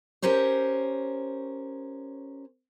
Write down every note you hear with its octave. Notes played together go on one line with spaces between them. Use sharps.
C#4 G4 A#4 C5 C#5